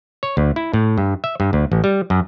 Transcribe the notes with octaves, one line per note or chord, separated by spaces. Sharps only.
C#5
D2
E4
A2
G2
E5
G2
D2
A1
G3
F#2